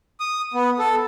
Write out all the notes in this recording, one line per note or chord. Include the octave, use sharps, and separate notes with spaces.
D#6
B3
A4